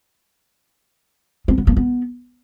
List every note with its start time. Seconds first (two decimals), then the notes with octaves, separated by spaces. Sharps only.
1.48 C4
1.58 B3
1.67 A#3
1.77 B3